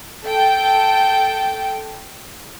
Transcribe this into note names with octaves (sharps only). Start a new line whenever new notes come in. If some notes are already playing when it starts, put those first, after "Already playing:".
A4 G5